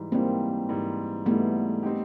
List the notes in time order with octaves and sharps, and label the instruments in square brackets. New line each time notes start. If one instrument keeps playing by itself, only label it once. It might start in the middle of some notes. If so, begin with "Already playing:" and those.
Already playing: [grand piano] G#2 E3 G3
[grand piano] G#2 E3 G3 [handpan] A#3 C4
[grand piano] G#2 E3 G3
[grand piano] G#2 E3 G3 [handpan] A3 B3
[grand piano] G3 C4 D#4 G4